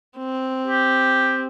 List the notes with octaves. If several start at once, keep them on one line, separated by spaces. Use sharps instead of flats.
C4
G4